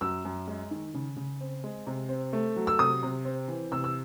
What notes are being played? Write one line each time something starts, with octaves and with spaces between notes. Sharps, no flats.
F#2 E6
F#2
G#3
D#3
C#3
C#3
C4
G#3
C3
C4
A3
F#3
E6
C3 D#6
C3
C4
E3
C3 E6
E6